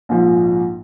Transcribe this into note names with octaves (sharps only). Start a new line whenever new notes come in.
A#1 G#2 F3